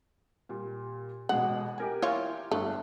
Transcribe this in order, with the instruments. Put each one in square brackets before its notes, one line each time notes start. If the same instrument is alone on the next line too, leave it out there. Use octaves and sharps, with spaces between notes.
[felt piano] A#2 G3
[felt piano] A1 B2 G#3 [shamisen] F#5
[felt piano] G4 A#4 G#5
[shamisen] E3 F4 C#5
[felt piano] G1 G2 [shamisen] A3